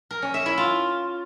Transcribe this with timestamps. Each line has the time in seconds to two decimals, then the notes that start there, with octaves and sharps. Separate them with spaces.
0.11 A#4
0.22 C#4
0.34 E5
0.46 E4
0.58 F4